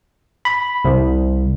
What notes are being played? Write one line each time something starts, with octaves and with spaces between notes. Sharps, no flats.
B5
C2